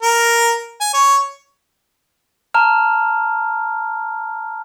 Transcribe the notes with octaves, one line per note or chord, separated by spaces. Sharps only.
A#4
G#5
C#5
A5 A#5 F6